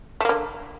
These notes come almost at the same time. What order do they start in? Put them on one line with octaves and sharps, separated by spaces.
A3 A#3 D3